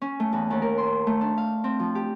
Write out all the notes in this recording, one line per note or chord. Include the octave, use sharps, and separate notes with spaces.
C#4
A3
E2
D#2
A#4
C6
A3
D4
F5
C4
F3
G4